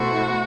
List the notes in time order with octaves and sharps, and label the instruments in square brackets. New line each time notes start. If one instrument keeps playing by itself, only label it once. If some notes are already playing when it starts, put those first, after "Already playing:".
Already playing: [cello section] B2 A3 E4 A4 C5 [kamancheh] F#4